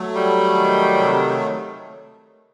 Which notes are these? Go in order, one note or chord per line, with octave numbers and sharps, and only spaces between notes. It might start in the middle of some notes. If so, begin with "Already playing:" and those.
Already playing: F#3 A3
G3
D#3
C3